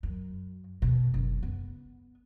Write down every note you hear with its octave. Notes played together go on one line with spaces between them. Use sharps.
F#2
B2
F#1
B3